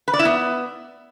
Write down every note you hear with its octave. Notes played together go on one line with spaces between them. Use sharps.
B4
D5
E4
B3